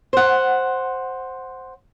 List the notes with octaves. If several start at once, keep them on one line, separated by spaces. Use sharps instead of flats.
C5 F#5